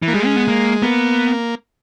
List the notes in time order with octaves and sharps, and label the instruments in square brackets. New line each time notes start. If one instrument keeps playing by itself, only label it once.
[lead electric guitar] E3
[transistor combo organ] A#3
[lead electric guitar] G3 [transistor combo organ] G#3
[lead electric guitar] C#4
B3
A#3
[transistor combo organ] A#3 [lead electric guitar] B3